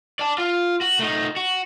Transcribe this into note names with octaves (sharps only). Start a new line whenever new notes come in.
D5 A5
F4
F#4
A3 D#4
F#4